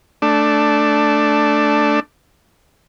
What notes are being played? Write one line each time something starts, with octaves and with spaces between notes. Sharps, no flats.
A3 D4